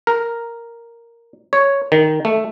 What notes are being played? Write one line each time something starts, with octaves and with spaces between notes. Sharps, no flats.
A#4
C#5
D#3
A3